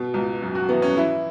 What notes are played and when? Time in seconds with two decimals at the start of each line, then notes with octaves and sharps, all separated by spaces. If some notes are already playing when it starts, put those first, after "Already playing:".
Already playing: B2
0.14 C#2
0.42 F#2
0.55 F#4
0.69 E3 B3
0.82 C#4
0.96 E3 E4